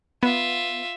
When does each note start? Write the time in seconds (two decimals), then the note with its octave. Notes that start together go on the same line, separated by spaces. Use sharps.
0.23 B3 F4 E5